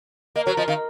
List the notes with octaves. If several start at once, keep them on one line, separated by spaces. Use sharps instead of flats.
A#3 D#5
F#3 C#5
F3 D#5
D#3 F5